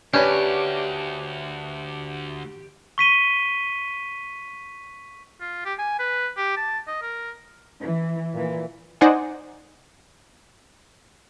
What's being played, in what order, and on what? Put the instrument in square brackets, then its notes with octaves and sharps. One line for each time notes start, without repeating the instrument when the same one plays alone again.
[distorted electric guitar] D2 [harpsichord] C#4 [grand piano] D4 B4 C#5 [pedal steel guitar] G4
[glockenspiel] C#6 B6 D#7 G7
[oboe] F4
G4
G#5
B4
G4
A5
D#5
A#4
[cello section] E3
A#2 E3
[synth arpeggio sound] D#4 C5 D5 D#5 F#5 G#5